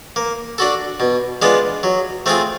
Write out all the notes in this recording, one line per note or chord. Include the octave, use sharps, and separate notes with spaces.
A#3
D4 F#4 A4
B2
G#3 B3 D4 F4
F#3
A3 C4 F4 G#4